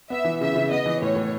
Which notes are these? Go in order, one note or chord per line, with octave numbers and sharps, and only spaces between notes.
B3 E5
E3
C#3 E5
C#3
B3 D#5
E3
A2 C#5
A2